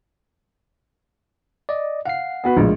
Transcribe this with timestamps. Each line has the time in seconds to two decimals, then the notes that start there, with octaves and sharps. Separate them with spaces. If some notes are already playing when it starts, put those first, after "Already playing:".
1.69 D5 D#5
2.05 F5 F#5 C7
2.44 B3 F#4 B4
2.57 A#1 A2 G#3 F4 G#4